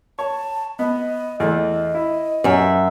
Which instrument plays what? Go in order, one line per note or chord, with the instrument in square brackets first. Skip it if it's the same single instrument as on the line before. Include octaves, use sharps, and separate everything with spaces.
[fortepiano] C#5 [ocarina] A5
[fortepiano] B3 [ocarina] D#5
[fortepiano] E2 A3 [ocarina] D#5
[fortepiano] E4
[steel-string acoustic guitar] F#2 E5